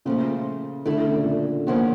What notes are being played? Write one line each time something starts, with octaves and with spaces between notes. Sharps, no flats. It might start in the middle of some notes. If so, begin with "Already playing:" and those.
A#2 C#3 F3 A3
D3 A3 E4 A4
C#3
A#2
A#2
E2 C#3 F3 A#3 C#4